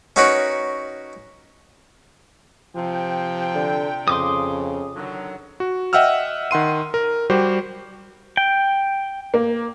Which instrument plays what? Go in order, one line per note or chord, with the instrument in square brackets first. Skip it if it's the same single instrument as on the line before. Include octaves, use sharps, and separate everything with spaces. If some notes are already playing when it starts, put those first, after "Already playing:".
[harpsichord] C#4 D#4 F#4 A#4 B4 C#5
[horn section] C3 G5 [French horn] F3
[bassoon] D3
[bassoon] F2 [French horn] C#3 [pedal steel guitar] C6 D6 D#6
[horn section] D3 D#3 F#3
[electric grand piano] F#4
D#5 E5 F#5 G5 E6 F6
D#3 F#5 C6 D#7
A#4
G3 F#4 G4 C5
[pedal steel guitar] G5
[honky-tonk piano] A#3